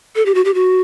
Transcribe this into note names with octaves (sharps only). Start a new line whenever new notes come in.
A4
G4
F#4
G4
F#4